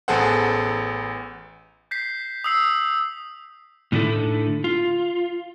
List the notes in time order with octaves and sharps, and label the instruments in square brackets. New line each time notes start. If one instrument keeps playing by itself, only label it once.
[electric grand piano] A1 B3 G#4 A4 C5 F#5
[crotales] G6 B6 C7
D#6 E6 C7
[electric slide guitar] A2 D3 D#4 E4 A4
F4